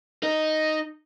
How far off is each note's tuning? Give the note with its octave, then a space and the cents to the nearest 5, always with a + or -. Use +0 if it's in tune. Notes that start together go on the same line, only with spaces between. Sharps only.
D#4 +0 D#5 +0